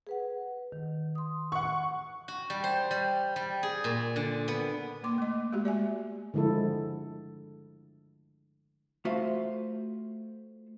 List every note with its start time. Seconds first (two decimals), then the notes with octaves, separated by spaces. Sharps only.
0.07 G#4 B4 F#5
0.72 D#3
1.15 C6 D#6
1.52 F#5 C#6
2.28 F#4
2.50 G3
2.64 C5
2.91 G3
3.36 G3
3.63 G#4
3.84 A#2
4.16 D3
4.48 B3
5.04 A#3 C6 D6
5.18 A3 D#5
5.53 G#3 A3 F#4 G4
5.65 D5 E5 G#5
6.34 D3 F3 G#3 E4 A4
9.05 A3 F4 F#4 C5 E5 F5